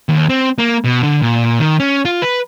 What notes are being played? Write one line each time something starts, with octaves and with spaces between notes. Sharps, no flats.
D#2
C4
A#3
B2
D3
A#2
D#3
C#4
F4
B4